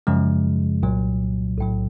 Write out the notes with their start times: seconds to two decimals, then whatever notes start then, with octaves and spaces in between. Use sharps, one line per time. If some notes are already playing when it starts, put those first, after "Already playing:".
0.07 F#2 C#3 F3 G#3
0.83 C2 A#2 F#3
1.58 B1 A2 F#3